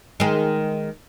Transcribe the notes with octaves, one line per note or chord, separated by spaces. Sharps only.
D#3 G#3